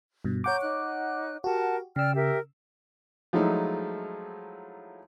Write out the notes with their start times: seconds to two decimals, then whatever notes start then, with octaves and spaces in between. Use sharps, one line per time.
0.25 G2 B2
0.44 C#5 F#5 A#5 D6 G6
0.61 D#4 F#6
1.44 F#4 G4 A#4 F#5 A5
1.96 C#3 D5 G5 E6 F6
2.15 G4 A#4 E5
3.33 F3 F#3 G#3 A3 D#4 E4